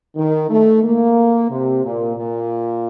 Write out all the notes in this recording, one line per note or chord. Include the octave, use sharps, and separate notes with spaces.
D#3
A3
A#3
C3
A#2
A#2